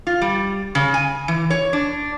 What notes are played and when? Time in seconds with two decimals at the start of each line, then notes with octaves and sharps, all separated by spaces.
0.07 F4
0.22 G3
0.75 C#3
0.94 G#5
1.28 E3
1.50 C#5
1.73 D4